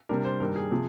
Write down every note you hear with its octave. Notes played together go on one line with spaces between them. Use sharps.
C3 G3 D4 A#4
C5
G2 D#3 G3 A#4
G#4
C3 F3